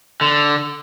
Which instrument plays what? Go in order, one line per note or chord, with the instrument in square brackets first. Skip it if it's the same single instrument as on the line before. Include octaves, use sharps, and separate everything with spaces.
[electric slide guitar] D3